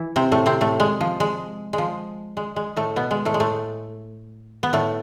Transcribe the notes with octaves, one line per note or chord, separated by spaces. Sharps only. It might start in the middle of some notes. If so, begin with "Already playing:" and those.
Already playing: E3 E4
C3 C4
A2 A3
C3 C4
A2 A3
G#3
F3
G#3
G#3
F3
G#3
G#3
A2 A3
B2 B3
G#3
A2 A3
G#3
A2 A3
B3
A2 A3